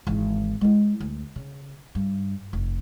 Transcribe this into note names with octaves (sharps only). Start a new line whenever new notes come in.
G#1 E3
G#3 E4
D2
C#3
G2
F1